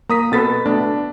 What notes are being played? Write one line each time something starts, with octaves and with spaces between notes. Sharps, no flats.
A#3 A#5 D#6 B6
B2 C4 A4 B4 A6 B6
A3 B3 D4